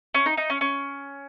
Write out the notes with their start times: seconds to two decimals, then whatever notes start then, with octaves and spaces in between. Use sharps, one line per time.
0.14 C#4
0.26 D#4
0.37 D#4
0.50 C#4
0.61 C#4